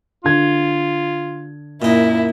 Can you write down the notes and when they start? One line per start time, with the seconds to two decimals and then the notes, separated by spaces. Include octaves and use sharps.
0.24 D3 F4 G#6
1.82 F#2 A#2 D#4 E4